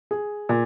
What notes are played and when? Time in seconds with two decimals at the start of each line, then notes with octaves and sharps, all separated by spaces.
0.11 G#4
0.49 A#2